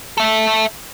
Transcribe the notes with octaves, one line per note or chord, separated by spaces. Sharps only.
A4 E5